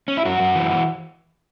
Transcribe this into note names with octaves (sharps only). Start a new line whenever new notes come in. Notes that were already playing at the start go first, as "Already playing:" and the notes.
C#4
E4
F#2 F#4
F#2
E3
E3